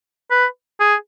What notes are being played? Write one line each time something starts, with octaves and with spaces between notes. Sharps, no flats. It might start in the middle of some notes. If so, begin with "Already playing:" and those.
B4
G#4